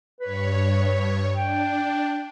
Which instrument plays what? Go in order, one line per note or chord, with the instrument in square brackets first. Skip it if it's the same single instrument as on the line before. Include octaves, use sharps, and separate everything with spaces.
[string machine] G2 C#5 [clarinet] B4
[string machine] D4 [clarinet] G5